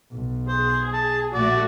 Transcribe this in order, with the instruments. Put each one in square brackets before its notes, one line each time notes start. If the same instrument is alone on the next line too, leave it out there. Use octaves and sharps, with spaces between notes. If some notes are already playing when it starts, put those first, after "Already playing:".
[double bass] B1
[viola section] G#4 [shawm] C5
[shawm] A5
[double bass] A#1 [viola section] A3 F#4 [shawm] D5